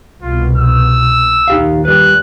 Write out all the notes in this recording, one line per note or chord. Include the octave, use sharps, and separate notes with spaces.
C2 B2 F4
E6
A#1 D#2 D#4 G4 F5
G3 B4 F#6